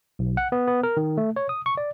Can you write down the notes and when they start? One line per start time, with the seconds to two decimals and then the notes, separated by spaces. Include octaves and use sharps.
0.19 B1
0.37 F#5
0.52 B3
0.68 B3
0.83 A#4
0.97 D#3
1.17 A3
1.36 C#5
1.49 D#6
1.66 C#6
1.77 D5